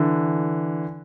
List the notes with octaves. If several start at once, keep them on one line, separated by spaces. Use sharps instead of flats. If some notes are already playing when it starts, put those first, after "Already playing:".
Already playing: D3 E3